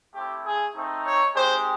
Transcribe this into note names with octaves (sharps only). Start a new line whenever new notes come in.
A3 C4 E4 G4
G#4
A3 C4 D#4
C#5
G#3 C4 D#4 G4 C5